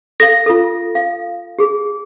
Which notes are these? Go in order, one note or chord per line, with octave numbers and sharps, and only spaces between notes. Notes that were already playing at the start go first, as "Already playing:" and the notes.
A4 F5 A#6
F4 A4
F5
G4 G#4